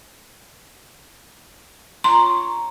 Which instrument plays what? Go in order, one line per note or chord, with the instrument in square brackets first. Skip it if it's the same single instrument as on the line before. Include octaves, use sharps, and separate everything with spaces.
[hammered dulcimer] C#5 A#5 [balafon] C6